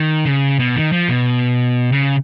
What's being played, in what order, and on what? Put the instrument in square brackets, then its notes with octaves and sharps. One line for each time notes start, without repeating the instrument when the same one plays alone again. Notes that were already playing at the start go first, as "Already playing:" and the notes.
Already playing: [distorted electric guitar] D#3
C#3
B2
D#3
F3
B2
C#3